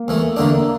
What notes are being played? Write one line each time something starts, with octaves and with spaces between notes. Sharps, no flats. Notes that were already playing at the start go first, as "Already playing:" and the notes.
Already playing: A#3
E2 E3 A3
E2 D3 A3 A#3 D4
A#3